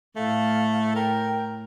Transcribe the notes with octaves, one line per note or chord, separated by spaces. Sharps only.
A2 A3 F5
A#4 G5